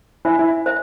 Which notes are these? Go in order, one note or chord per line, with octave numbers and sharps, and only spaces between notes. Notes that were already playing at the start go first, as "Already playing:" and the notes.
E4 C5 E5 G#5
E4
C5 E5